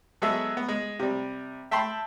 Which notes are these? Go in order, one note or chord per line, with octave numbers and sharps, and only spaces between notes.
F#3 G#3 B3 G#4 A4 E5
B3
G#3
C3 G3
E5 G5 A5 B5 C6